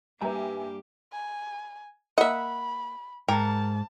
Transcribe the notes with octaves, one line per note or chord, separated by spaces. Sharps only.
G2 G3 A#3 G4 B4 E5 G#5 A#5
G#5
A#3 D#5 E5 F#5 B5
G#2 A#4 G5 A5